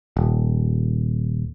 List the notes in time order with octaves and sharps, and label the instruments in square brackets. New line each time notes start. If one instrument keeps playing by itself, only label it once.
[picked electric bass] D#1